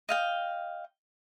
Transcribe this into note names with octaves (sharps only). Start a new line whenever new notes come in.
D#5 F5 G5